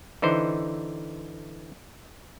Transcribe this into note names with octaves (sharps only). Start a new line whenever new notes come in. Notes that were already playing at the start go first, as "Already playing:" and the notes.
D3 E3 D#4 C5